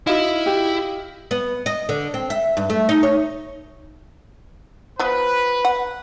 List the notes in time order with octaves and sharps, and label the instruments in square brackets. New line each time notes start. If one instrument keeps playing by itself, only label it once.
[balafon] D#4 F#4 [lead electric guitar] E4 [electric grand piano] D#5 F5
[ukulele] G4
[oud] B3
D#5
D3
C4
E5
G2
A3
D#4
C#5
[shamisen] F3 B3 [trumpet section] B4
[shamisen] F#5